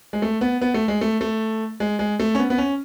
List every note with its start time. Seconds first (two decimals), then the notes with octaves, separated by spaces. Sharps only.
0.13 G#3
0.22 A3
0.41 B3
0.61 B3
0.74 A3
0.88 G#3
1.01 A3
1.21 A3
1.80 G#3
1.99 G#3
2.20 A3
2.35 C#4
2.39 B3
2.50 B3
2.58 C#4